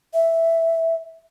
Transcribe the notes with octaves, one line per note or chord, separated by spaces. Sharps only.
E5